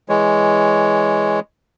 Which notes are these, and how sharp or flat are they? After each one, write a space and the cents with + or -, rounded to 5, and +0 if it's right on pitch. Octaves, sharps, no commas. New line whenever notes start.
E3 +0 G#3 +0 C#5 +0